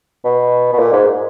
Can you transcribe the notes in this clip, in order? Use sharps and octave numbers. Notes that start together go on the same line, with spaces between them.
B2
B2
A#2
G#2